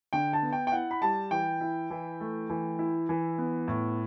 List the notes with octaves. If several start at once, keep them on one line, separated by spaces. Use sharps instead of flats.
D3 G5
A5
B3
G5
G5
E4 F#5
B5
G3 A5
E3 G5
E4
E3
A3
E3
E4
E3
B3
A2